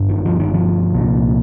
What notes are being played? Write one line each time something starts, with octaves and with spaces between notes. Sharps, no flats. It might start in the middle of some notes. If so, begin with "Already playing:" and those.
Already playing: G1 G2
D#3
F3
D#3
F3
C2 A#2